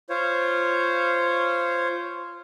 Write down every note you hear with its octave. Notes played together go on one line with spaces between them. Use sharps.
F4 C5 C#5